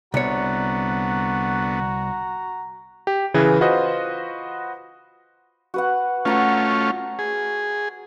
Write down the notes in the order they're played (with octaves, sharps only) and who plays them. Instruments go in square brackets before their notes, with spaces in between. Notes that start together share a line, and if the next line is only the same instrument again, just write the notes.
[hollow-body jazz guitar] C2 C#5 [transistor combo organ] D3 B3 [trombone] F#4 [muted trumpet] A#5
[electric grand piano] G4
C#3 E3 E4 G#4 B4
F4 F#4 B4 C5 D#5
[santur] F#4 B4 F#5
[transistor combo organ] A3 C#4 F4 [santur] F#5 A#5 C#6
[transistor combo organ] G#4